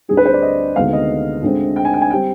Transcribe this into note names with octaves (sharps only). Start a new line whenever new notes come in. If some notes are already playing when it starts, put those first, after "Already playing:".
D2 D3 G3 C4 G#4
B4
C5
D5
D#5
D2 C3 D#3 G#3 B3 F5
D#5
D2 D3 G#3 C4
G5
G#5
G5
G#5
G3 C4 G5